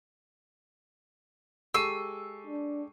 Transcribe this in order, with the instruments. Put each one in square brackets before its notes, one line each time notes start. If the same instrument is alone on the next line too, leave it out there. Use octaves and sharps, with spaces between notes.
[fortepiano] G#3 G4 A4 [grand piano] C#6 C7 D#7 [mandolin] E6
[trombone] D4